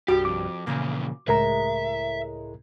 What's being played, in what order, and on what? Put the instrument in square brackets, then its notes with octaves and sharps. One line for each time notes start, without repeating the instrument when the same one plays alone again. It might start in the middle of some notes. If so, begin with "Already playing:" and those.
[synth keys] C2 G2 G3 [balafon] F#4 [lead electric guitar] G4
[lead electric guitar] F2 [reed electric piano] D6
[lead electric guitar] E2 F3 [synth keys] A#2 C#3 A#3
[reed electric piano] C#2 A#4 A#5 [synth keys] A2 G#3 [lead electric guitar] E5